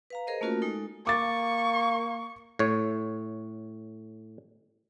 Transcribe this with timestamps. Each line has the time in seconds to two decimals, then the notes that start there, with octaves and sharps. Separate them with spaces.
0.10 B4 F5 A#5
0.27 G#4 A#4 C5 D#5
0.41 A3 A#3 C#4 F4 F#4 A#4
0.62 G#3 D#4 A4
1.07 A#3 C#6 D6 A6
2.59 A2 C#5